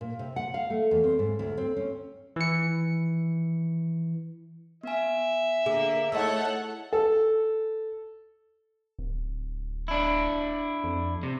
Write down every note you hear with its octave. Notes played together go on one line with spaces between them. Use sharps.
A#2
C3
F#5
F5
A3
E2
C4
G#2
D2
C4
C#4
E3 C#7
B3 E5 G#5
D3 A#3 G#4
A3 D#4 E4 A4 C#5 F#5 E6
A4
D1
D4 E4
F2
C3